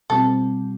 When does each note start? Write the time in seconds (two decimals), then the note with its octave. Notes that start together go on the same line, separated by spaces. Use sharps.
0.10 B2 G3 C4 F4 A4